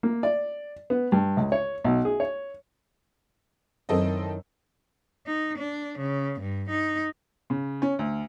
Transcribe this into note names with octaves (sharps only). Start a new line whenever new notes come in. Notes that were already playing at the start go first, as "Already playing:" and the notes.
A#3
D5
B3
G2
C#2
C#5
B1
G#4
C#5
F#2 D#3 C4 E4 A4 D#5
D#4
D4
C#3
G2
D#4
C#3
C#4
D2